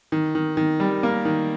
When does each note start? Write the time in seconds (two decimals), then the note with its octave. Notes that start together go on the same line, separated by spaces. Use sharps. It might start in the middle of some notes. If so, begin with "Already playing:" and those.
0.12 D#3
0.35 D#3
0.57 D#3
0.80 G3
1.03 A#3
1.25 D#3